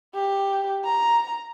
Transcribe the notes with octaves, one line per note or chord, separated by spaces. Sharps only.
G4
A#5